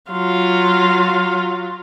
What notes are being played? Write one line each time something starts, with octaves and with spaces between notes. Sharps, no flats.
F#3 F4